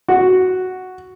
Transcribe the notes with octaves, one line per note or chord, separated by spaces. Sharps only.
F#4